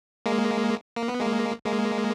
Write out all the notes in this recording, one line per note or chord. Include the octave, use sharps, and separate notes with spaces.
G#3 A#3
A#3
B3
G#3 A#3
G#3 A#3